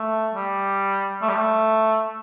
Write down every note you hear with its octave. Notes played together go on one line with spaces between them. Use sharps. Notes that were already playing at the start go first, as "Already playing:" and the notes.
Already playing: A3
G3
A3
G3
A3